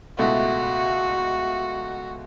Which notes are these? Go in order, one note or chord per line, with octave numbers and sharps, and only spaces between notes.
C#2 B2 A3 E4 F#4